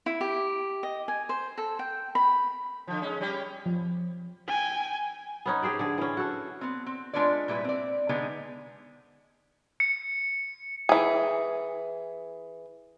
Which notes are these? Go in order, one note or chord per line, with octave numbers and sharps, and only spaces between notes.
E4
G4
D#5
G#5
C5
A4
G5
B5
D3 F3
G#3 C#4
G3 C#4 G4
F3
G5 G#5
B3 C#4 D#4
G4 G#4 C5 D5
D3 G#4
E3 C#4
F#4 A4
B3 C4
C4
G#3 D4 F4 B4 C#5 D5
A#2 G3 E4 B4
C4 D5
D3 G#3 B3 D#4 G#4
C#7
E3 G#4